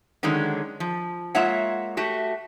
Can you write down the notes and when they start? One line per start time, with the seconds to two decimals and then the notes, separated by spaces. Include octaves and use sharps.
0.23 D3 D#3 F#3 G#3 C#4
0.80 F3
1.35 G#3 A#3 F4 C#5 E5 F#5
1.97 A3 F#4 G4